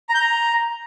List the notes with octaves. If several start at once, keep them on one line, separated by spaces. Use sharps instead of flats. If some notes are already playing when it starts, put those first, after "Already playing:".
A#5
G6
A#5